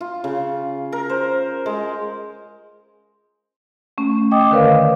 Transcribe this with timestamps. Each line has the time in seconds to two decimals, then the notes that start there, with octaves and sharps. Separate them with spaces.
0.01 F4
0.24 C#3
0.92 A#4
1.09 C5
1.66 G#3
3.98 A3 C#4
4.31 D#5 G5 D6 D#6
4.51 D3 D#3 A#4 B4 C#5 F5